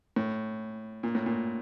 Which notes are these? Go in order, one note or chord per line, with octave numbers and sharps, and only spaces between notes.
A2
A#2
A2
A#2